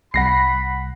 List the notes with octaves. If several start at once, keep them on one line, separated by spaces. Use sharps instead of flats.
C2 F#5 B5 A#6 C7